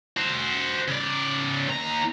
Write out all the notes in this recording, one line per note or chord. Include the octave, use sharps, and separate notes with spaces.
F#4 C5
C#3 D5
D#2 A#5